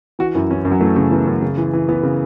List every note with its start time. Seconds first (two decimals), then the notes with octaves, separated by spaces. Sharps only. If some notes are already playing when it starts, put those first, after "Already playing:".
0.19 E3 F#4
0.35 F#2 E4
0.51 E3 C#4
0.65 F#2
0.71 F#3
0.81 E3 A3
0.96 C#3 A3
1.11 E3 B3
1.27 F#2
1.42 C#3
1.58 E3
1.73 E3
1.89 E3 B3
2.03 C#3